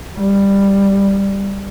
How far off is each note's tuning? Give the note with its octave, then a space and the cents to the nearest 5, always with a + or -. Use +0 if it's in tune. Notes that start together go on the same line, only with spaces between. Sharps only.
G3 +10